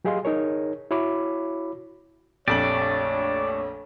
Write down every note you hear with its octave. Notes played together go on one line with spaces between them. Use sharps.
F#3 G4 G#4 D#5 F5 C6
D#4 G#4 A#4 C#5
E4 F#4 C#5 B5 D6
A#1 F2 A3 D4 G4 C#5 D5 F#7